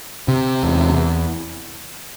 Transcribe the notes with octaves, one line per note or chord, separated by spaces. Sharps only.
C3
E2